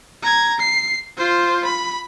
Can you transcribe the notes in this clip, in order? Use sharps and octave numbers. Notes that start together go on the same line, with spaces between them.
A#5 G#6
C7
F4 C5
B5